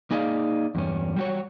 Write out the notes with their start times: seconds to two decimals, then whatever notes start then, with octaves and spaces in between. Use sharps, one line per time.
0.11 A#3 D#4 G#4 D5 D#5 F5
0.75 E2 G2 C#4
1.16 G3 F#4 C#5